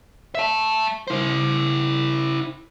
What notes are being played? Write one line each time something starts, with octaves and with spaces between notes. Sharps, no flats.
E5 A5
E4 C5